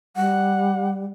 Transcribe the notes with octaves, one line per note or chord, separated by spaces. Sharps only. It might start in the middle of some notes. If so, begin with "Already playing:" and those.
G3 F#5